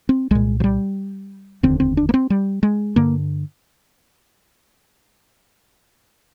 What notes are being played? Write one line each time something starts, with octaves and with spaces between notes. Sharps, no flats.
C4
C2 A#2 G#3
F3
G3
F1 D#2 D3 C4
C4
D4
A#3
C4
G3
G#3
G2 D3 A#3